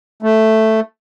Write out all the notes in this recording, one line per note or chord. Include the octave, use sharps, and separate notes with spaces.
A3